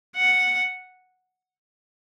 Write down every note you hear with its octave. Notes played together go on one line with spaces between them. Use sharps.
F#5